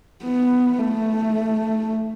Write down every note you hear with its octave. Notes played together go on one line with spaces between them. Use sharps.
B3
A3